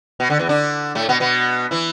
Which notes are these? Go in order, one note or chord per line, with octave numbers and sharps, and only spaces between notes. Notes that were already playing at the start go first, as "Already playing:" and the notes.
B2
D3
E2 E3
D3 D4
A2 A3
B2 B3
B2 B3
E3 E4